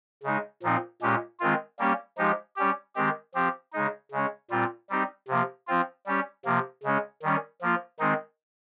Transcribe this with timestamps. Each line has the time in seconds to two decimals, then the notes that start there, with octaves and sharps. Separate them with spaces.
0.24 C#3 G#3 D#4
0.63 A#2 F3 C4 D#4
1.02 A#2 G#3 C#4 G4
1.40 D#3 G#3 C4 F4
1.79 G3 A#3 C#4 G4
2.18 F3 G#3 D#4 G4
2.56 G3 C#4 G4
2.95 D#3 G#3 C4 G4
3.34 F3 C4 G4
3.73 C#3 G#3 D#4
4.12 C#3 G#3 C#4
4.50 A#2 G3 C4 F4
4.90 G3 C4 D#4 G4
5.28 C3 F3 A#3
5.68 F3 C4 F4
6.06 G3 C#4 G4
6.45 C3 F3 A#3
6.84 C#3 G#3 C#4
7.22 D#3 G3 C#4
7.61 F3 A#3 F4
7.99 D#3 G#3 C4 D#4